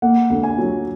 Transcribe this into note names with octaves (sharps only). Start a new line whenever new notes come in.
A#3 F#5
D2
G#5
F#3